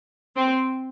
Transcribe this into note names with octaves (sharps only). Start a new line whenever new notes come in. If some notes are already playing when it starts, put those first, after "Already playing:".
C4